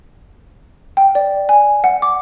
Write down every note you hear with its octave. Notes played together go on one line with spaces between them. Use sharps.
G5
D5
G#5
F#5
D6